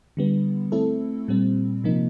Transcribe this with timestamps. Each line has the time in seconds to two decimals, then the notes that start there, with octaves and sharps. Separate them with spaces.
0.17 D3 G3 B3
0.72 A3 C4 E4 A4
1.28 A#2 G3 C4
1.84 C3 F3 A#3 D#4